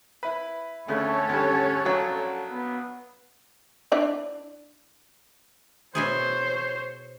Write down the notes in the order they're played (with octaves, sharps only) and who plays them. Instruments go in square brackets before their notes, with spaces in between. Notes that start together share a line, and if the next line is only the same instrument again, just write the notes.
[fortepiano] E4 B4
[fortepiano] D2 C#3 [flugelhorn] A3 [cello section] C#4 A4 C#5
[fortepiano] D2 G3 [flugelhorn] F#5
[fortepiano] A#1 F#3
[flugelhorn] B3
[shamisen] D4 E4 D5
[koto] B2 E4 G#4 [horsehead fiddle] C5 C#5